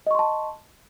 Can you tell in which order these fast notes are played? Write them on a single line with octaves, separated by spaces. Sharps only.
D#5 C#6 C6 A5